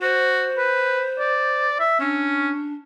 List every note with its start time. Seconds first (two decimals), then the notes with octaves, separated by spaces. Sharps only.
0.02 F#4 C5
0.58 B4
1.19 D5
1.80 E5
2.00 C#4 D4